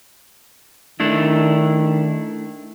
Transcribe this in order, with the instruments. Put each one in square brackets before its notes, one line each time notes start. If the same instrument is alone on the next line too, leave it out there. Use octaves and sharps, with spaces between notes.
[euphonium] D#3 [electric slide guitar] A3 D4 E4